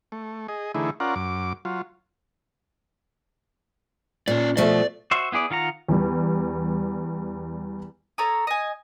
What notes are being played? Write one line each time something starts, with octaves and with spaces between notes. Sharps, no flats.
A3
G#4 D#5
D3 E3 A3 D#4 E4 G#4
C#4 F4 A#4 D5 F#5
F#2 D6
F#3 F4
A#2 C#4 D5
B2 F3 A3 D5
F#4 C5 E5
B3 E4 G#4 D5
D#3 F4 F#5 A#5
E2 G3
A4 C#5 A#5 D#6
D#5 G#5